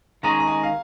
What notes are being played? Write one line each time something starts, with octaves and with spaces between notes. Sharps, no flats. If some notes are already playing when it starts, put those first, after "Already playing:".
D#3 G#3 C#4 G#4 D#5 A#5
A#5
G#5
F5